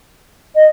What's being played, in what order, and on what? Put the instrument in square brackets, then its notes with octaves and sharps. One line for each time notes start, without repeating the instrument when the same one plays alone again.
[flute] D#5